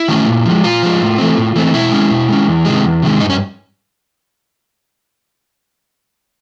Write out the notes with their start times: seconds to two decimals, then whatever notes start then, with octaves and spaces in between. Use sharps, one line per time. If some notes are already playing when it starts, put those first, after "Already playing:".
Already playing: E4
0.08 D#3 F#3 A3 C#4
0.28 A#2
0.45 F3 G#3
0.64 A#2 F4
0.83 F3 G#3
1.01 A2
1.18 E3 A3 C4
1.38 A2
1.56 E3 A3 C4
1.73 B2 E4
1.92 G#3 C#4
2.11 B2
2.29 G#3 C#4
2.47 E2
2.65 C3 D#3 G#3
2.84 E2
3.03 C3 D#3 G#3
3.20 G2 D#4
3.30 C#4